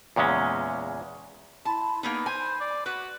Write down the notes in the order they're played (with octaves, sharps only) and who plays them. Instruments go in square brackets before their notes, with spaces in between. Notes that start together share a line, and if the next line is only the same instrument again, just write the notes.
[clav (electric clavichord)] E2 A#2 C#3 G#3 C#4
[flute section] E4 B5 C6 [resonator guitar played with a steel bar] A5
[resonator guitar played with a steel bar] A#3 B3 D#4 [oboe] G#4 [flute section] B5
[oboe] C5 [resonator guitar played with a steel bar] G#5
[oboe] D5
[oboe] F#4 [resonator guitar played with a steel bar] B4